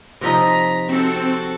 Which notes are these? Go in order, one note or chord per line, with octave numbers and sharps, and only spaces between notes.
C3 F3 D#4 A#5 B6
C4 F#4 A4